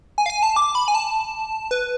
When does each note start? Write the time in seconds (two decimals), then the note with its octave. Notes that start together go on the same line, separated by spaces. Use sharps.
0.18 G#5
0.26 F5
0.30 G#5
0.43 A5
0.56 D6
0.75 B5
0.88 G#5
0.95 A5
1.71 B4